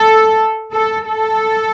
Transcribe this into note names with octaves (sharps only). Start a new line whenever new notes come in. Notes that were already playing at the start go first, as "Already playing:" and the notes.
Already playing: A4
A4
A4